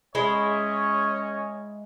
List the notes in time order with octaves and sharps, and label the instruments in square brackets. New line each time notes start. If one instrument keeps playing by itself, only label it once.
[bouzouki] G#3 E4 [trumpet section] C#4 C#5 D#5